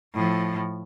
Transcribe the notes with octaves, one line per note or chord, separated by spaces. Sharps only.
A2 F3